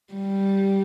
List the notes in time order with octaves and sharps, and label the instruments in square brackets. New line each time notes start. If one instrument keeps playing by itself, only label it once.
[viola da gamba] G3